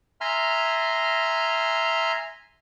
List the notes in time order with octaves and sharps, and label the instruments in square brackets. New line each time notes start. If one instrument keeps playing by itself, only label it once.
[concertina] E5 G#5 A#5 C6 F6